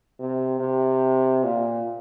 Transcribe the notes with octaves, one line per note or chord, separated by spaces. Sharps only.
C3
C3
A#2